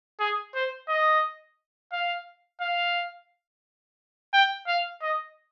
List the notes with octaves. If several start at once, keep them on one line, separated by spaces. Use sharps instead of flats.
G#4
C5
D#5
F5
F5
G5
F5
D#5